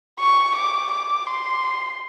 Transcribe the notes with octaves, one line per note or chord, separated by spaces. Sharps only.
C#6
D6
D6
C6